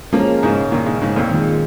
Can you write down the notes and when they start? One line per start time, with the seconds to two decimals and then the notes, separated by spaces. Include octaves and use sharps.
0.13 F3 G#3 A#3 C#4 A#4
0.43 G#2 C#3
0.72 A#2 D#3
0.86 G#2 C#3
1.01 G#2 C#3
1.16 F2 A#2
1.31 D#3 G#3 F4